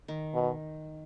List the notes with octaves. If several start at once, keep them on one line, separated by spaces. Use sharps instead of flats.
D#3
B2